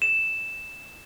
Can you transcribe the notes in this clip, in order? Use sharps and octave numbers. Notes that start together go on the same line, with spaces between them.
E7